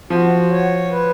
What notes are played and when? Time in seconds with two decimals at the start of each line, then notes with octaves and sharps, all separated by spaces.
0.10 F3 F#4
0.51 C#5
0.91 B4